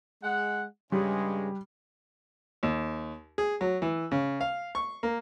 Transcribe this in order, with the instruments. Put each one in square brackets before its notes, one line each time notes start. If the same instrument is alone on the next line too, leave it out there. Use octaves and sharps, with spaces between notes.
[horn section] G#3 F#5
[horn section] G2 C#3 G#3 [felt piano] G3
[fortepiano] D#2
G#4
F#3
E3
C#3
F5
C#6
A#3